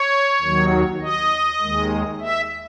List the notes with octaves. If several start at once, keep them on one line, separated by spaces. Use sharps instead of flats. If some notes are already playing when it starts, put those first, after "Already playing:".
Already playing: C#5
D#2 D#3 F#3
D#5
D#2 D#3 G#3
E5